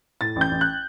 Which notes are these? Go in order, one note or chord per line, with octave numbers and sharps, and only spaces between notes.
A2 A6
A1
G6
A1
F#6